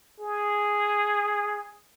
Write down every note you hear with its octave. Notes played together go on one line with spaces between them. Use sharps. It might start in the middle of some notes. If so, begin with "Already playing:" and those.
G#4